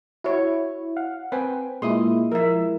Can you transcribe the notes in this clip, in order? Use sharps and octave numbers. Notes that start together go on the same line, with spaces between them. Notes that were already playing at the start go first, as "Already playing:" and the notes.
E4 F#4 C#5
F5 F#5
C4 B4 G5 G#5
A#2 G#3 E4 C6 D#6
F3 A#4 E5